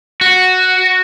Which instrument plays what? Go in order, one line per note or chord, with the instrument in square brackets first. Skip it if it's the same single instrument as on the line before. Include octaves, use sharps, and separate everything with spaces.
[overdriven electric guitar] F#4